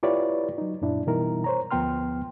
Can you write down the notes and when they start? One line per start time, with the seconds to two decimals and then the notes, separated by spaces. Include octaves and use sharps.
0.03 E4 F4 G4 B4 C#5 D5
0.58 F#3 D#4
0.82 F#2 A#2 D4 E4
1.07 B2 E3 G3 D#4 E4 A#4
1.44 C5 C#5 A#5
1.71 D2 F3 B3 G5 C6 F6